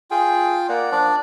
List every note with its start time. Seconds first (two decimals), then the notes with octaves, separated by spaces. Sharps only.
0.11 F4 G#4 G5
0.69 A#3 D5 F#5
0.92 F3 D4 D5